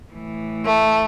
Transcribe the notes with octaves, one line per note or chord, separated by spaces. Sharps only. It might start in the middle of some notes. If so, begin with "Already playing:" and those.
A2 E3
A3